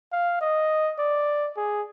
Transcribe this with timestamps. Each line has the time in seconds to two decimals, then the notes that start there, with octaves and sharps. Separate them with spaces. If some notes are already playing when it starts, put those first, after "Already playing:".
0.12 F5
0.41 D#5
0.98 D5
1.57 G#4